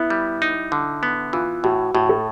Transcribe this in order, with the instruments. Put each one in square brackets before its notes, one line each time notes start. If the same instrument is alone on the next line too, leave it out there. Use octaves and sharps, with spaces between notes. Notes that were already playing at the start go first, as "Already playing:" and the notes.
Already playing: [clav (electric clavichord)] B3 [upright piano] E4
[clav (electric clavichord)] G3
D#4
D3
B3
[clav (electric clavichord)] E3 [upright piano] F4
[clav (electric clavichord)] A2 [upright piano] F#4
[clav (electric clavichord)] A2 [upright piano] F#4
[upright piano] A4